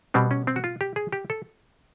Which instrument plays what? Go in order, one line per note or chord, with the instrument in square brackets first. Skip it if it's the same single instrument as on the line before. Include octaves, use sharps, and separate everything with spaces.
[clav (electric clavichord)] B2 G3 B3 C4
C#4
C4
F#4
F4
G4
G#4
G4
A4